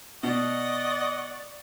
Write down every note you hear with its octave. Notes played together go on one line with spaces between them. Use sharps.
B2 D5 D#5 F#5 C#6 A6